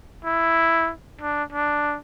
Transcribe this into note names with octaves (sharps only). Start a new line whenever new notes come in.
E4
D4
D4